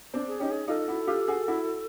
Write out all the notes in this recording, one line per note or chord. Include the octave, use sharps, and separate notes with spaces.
C4 D4
G#4
C#4 D#4 G4
G#4
D#4 F4 A4
E4 F#4
F4 G4
F#4 G#4
E4 F#4